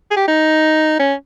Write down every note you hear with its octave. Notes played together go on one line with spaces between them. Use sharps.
G#4
G4
D#4
C#4